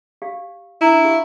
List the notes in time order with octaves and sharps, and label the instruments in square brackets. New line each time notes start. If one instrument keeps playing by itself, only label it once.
[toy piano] G4 D5 F5
[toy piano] D4 A#5 [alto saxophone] E4
[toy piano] G4 F5